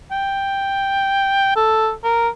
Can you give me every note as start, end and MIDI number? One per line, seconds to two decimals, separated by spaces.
0.11 1.54 79
1.56 1.92 69
2.04 2.29 70